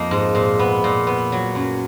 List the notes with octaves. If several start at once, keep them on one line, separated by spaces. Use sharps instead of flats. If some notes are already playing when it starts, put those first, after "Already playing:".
Already playing: F2 A#3 D#4
G#2
A#2
B3
A#2
B3
F#3
F#2